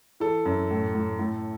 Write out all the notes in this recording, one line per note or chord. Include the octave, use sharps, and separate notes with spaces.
E3 A4
F#2
A2
A2
A2